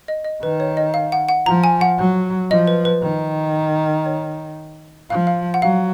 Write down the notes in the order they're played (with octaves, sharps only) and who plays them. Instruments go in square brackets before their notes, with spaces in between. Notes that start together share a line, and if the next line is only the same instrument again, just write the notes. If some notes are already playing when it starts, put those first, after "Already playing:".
[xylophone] D#5
D#5
[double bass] D#3 [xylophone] B4
[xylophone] C#5
D#5
F5
F#5
F#5
[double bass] F3 [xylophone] A#5
[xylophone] G#5
F#5
[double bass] F#3
[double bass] F3 [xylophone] D#5
[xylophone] B4
B4
[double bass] D#3
[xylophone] C#5
[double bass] F3 [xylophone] F5
[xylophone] F5
F#5
[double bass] F#3 [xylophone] F5